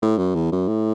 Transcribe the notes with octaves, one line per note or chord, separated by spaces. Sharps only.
A2
F#2
E2
F#2
A2